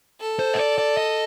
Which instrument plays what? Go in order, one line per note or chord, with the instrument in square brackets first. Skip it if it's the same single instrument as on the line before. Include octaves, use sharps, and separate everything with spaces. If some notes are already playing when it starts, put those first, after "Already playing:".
[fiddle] A4
[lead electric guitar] C5
D#5
D5
D5
D#5